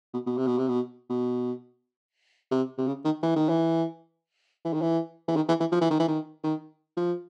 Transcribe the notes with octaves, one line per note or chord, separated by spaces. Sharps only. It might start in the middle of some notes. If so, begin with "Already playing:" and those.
B2
B2
C3
B2
C3
B2
B2
C3
C3
C#3
D#3
E3
D#3
E3
E3
D#3
E3
E3
D#3
E3
E3
F3
E3
D#3
E3
D#3
D#3
F3